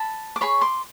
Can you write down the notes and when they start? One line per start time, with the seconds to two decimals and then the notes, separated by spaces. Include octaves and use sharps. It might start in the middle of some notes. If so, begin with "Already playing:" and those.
Already playing: A5 B5
0.36 D6
0.41 G#4 C#5 B5 C#6
0.61 C6 D6